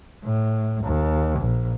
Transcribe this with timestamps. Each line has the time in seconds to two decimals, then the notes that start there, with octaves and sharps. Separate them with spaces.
0.24 A2
0.85 D#2
1.40 A#1